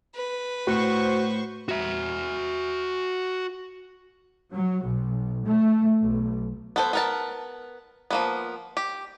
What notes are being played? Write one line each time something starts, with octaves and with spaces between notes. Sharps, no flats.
B4
A2 F#4 C5 C#6
F#4 E5
F#3
B1
A3
B1
B3 A4 C5
B3 A#4 A5
F3 A#3 B3
G4